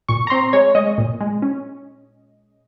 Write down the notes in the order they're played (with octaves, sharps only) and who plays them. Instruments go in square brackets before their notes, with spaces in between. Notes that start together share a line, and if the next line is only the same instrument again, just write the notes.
[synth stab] A#2 C#6
A#5
C4 C6
G#3 C#5
G#3 D#5
A#2
G#3
C#4